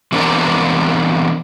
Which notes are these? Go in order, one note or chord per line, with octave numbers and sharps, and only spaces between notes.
E3 B3 C4 D4 A#4